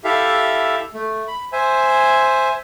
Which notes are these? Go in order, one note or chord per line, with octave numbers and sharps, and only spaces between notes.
E4 G4 A4 E5 F5
A3
B5
C5 E5 G#5